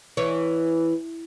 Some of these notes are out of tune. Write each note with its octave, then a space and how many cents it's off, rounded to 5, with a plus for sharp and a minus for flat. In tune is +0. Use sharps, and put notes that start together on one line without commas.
E3 +0 C#5 +0